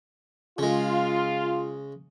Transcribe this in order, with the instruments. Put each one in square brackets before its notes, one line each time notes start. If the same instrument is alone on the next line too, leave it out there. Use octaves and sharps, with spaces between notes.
[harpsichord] C#3 G#3 [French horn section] F4